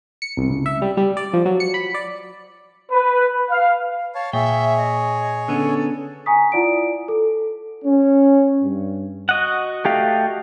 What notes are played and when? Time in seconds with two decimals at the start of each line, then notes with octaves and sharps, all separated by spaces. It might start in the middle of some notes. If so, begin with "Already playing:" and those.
0.22 C#7
0.37 C2
0.50 C#2
0.66 E5
0.82 G3
0.97 G3
1.17 D5
1.33 F3
1.45 F#3
1.60 C#7
1.74 B5
1.94 D5
2.91 B4
3.50 F5
4.15 C#5 F5 A5
4.33 A#2 G#4 C#5 E5 G5
4.78 D#5
5.48 D3 B3 C#4 A4
6.26 G#5 A#5 C#6 D#6 B6
6.52 E4 F4 D5 F#5 D7
7.08 A4
7.84 C#4
8.61 G2
9.29 F#4 D#5 F#5
9.85 A3 G4 F5